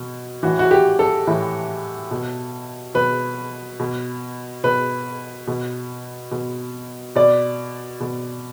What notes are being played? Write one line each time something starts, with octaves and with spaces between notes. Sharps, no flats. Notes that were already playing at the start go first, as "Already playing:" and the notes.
Already playing: B2
A2 E3 F#4
F#4
G4
A4
A2 E3
B2
B2 B4
B2
B2 B4
B2
B2
B2 D5
B2